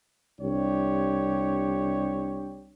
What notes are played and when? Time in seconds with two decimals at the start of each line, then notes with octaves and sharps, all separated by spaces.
0.41 C2 D4 G4 C#5